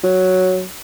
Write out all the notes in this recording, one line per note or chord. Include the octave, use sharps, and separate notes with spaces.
F#3